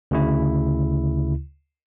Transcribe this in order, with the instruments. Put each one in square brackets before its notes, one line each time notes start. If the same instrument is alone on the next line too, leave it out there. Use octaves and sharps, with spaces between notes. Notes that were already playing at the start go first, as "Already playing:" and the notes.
[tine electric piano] D2 C#3 E4